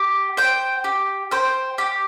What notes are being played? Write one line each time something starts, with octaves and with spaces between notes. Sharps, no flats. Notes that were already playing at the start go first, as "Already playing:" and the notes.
Already playing: G4
C5 G5
G4
C5 G5
G4